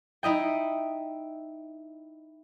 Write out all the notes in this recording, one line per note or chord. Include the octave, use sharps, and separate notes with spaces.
D#4 E4 D#5 G5